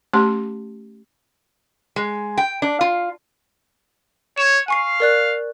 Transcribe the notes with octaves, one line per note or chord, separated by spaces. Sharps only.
A3 C#4 G4 A5 C6
G#3
G5
D4
F4
C#5 E7
F5 G#5 C#6 C7
A#4 D5 F#6